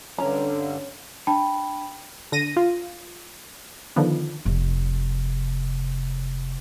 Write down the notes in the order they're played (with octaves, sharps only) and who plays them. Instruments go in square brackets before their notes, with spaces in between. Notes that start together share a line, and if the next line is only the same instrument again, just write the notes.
[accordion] G2 D3 [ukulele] C#4 A#5
[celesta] D4 G5 A5 B5
[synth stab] D3 A#6 D#7
F4
D3 D#3 F3 B3
[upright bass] F1 C3